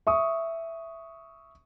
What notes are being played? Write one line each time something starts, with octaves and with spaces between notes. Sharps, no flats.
E5 C#6 D#6